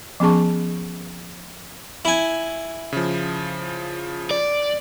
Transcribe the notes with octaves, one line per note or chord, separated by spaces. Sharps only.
F3 B3 C#4 G#4 A5 C#6
E4 G#5
C#3 F3
D5